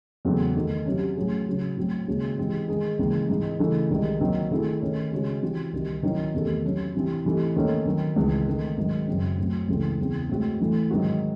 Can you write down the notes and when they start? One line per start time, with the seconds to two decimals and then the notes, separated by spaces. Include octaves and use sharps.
0.25 E2 C#3 F#3 A3 C4
0.56 D#3 A3 D#4
0.86 C3 F#3 C#4
1.16 A2 F#3 C#4 G#4
1.47 C#3 F#3 C#4
1.77 A2 F#3 C4
2.08 D#2 C#3 G#3 C#4 F#4
2.38 C3 E3 G#3 C4
2.68 D#3 G#3 D#4 G#4
2.99 D#2 C#3 E3 G#3 C4
3.29 G#2 E3 G#3 C4 D#4
3.59 C#3 E3 A3 D#4
3.90 C2 C3 D#3 G#3
4.20 D#2 D#3 F#3 C4
4.51 D#3 A3 C4 E4 G#4
4.81 D#3 A3 C#4
5.12 C#3 G#3 C#4 F#4
5.42 C3 E3 C4 F#4
5.73 C2 C3 D#3
6.03 D#3 F#3 C#4 E4
6.34 E2 C3 D#3 A3
6.64 C3 F#3 C#4
6.95 C3 E3 C4
7.25 C3 E3 A3 D#4
7.55 D#2 D#3 A3 C#4
7.86 D#3 F#3 C4
8.16 C#2 C#3 E3 C4
8.47 D#3 A3 C4
8.78 G#2 D#3 F#3 C4 D#4
9.08 F#2 C#3 F#3 C4
9.38 A2 F#3 C4
9.68 C#2 C#3 E3 A3 C4
9.99 E2 C#3 E3 C4
10.29 A2 G#3 C4 F#4
10.60 A2 E3 A3
10.90 G#2 D#3 F#3 C4 F#4